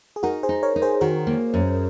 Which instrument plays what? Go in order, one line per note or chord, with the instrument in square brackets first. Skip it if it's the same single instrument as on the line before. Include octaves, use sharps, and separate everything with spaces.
[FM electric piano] G#4
[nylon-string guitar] D#4 [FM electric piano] F#4 A#4
[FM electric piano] G#4 C5
[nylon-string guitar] D#4
[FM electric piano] A#4 C#5
[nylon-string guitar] D#4
[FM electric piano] G#4 C5
[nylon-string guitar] D#3 [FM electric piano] F#4 A#4
[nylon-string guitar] A#3
F#2